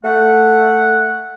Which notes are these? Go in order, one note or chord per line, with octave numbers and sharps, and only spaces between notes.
A3 F#5